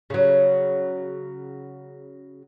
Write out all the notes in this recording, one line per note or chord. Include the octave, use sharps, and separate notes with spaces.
C#3 F#3